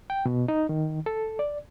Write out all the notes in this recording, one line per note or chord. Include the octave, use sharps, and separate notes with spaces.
G5
B2
D#4
D#3
A4
D5